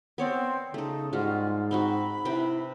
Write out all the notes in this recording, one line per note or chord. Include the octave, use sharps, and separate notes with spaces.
B3 C4 C#5 D5
C#3 A3 D#4 A4
G#2 G3 G#3 F4 F#4
C4 D#4 F#4 B5
C3 E4 B4 G5